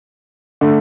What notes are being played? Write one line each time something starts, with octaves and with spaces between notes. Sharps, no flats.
D3 A3